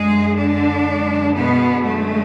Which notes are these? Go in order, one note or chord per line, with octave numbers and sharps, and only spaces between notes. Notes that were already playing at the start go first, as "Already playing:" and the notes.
Already playing: F#2 D3 G#3 G#4
D3 D4
F#2 D3 G#3
B2 B3
F#2 D3 G#3 A3